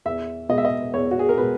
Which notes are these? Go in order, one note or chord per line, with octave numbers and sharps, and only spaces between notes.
E2 E5
B2 G#3 D#5
E5
D#5
E2 C#5
F#4
G#4
A#4
B2 G#3 B4